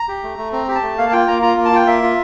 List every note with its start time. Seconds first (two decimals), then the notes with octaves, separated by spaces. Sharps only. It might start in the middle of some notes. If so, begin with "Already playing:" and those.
Already playing: A#5
0.08 G4
0.23 A3
0.38 A3
0.53 C4 A#5
0.68 G4 A#5
0.75 A5
0.83 A3
0.98 A#3 F5
1.06 A5
1.12 F4 G5
1.28 A#3 A#5
1.42 F4 A#5
1.57 A#3
1.65 A5
1.72 F4 G5
1.87 A#3 E5
2.03 F4